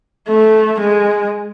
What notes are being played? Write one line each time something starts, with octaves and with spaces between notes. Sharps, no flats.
A3
G#3